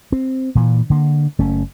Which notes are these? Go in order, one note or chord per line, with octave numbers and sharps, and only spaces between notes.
C4
A#2 E3
D3 A#3
F#1 A3 C#4